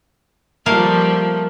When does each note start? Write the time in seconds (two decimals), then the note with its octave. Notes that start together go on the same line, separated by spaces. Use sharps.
0.66 F3 G3 A3 A#3 F5